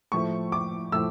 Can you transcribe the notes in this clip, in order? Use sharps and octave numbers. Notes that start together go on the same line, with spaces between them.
A2 F3 A3 C#6
D6
A2 F3 A3 E6